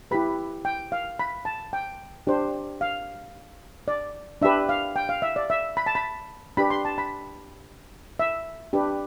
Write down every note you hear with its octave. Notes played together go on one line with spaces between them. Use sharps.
E4 G4 B4 B5
G5
F5
B5
A5
G5
D4 G4 C5
F5
D5
D4 G4 B4 E5
F5
G5
F5
E5
D5
E5
B5
A5
B5
D4 G4 B4 B5
C6
A5
B5
E5
D4 G4 B4